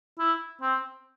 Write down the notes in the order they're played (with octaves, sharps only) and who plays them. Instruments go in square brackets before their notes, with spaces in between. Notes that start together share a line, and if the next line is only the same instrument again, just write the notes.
[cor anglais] E4
C4